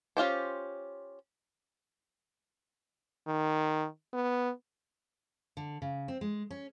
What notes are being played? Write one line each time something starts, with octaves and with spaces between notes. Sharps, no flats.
C#4 F4 G4 C5
D#3
B3
D3
C#3
C4
G#3
C#4